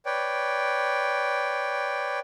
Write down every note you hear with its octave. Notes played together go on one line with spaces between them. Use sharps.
B4 C#5 D5 G5